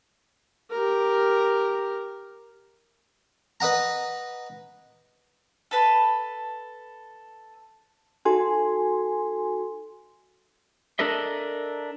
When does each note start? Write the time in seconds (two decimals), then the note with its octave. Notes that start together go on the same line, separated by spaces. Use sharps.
0.71 G4 A#4
3.60 B4 D#5 F#5 A#5
5.71 A4 B4 A5
8.25 D#4 F#4 A4 G#5 C6
10.99 D4 A4 A#4 D#5 E5